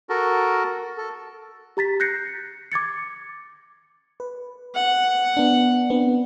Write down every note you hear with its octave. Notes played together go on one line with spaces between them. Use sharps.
F#4 A4 A#4
A4
G4 A#5 A6 B6
F#6 G6 A#6 C7 C#7
D6 G#6 A6 C#7
B4
F#5
B3 D4
B3 C4 D4